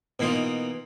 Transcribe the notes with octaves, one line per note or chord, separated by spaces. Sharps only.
B2 E3 A#3 D#4 F4